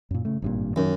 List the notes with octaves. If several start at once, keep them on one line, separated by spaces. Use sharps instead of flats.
F#2 A#2
C#3 A3
G#1 G2 A#2
F#2 D#3 F#3